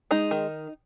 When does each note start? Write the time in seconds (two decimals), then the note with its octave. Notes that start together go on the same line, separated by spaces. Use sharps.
0.11 G#3 D#4
0.31 D#3